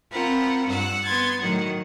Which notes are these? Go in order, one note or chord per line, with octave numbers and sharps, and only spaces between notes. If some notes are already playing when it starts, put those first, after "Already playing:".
C4 F4 A#4 F#5 B5
G2 F#5 E6 F#6
B3 C6 G#6 A6
A2 D#3 F#3 F#5